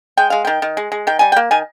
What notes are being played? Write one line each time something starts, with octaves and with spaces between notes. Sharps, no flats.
G#3 G5
G#3 F5
D#3 G5
D#3
G#3
G#3
D#3 G5
G3 G#5
G5
A#3
D#3 G#5